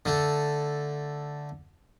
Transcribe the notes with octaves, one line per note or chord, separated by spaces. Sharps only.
D3 A3